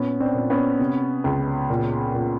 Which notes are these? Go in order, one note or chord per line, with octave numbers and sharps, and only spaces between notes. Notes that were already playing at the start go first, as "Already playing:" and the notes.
Already playing: A#2 B3 C#4
C4 D4
A#2
B3 C#4
C3
C#2
A#2
A#2